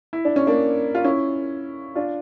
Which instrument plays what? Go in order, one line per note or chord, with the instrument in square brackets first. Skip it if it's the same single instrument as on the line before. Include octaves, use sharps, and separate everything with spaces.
[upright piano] E4
D4
C#4
A#3 D4
F4
C#4 E4
D4 F4